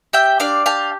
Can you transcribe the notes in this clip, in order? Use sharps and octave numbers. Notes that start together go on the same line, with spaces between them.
G4 E5 G5
D4 D5 F5
G4 F5 A5